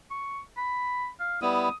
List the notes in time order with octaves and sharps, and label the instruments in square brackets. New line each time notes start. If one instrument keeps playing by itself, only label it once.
[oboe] C#6
B5
F5
[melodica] G3 B3 E4 [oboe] D#6